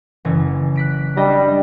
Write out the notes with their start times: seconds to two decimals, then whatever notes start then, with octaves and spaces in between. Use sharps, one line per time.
0.25 F#1 E3
0.76 F#6 B6 D7
1.17 G3 D4 D#5 G5